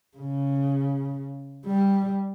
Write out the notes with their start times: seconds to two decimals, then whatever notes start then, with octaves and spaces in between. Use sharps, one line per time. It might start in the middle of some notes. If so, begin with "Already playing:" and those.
0.17 C#3
1.66 G3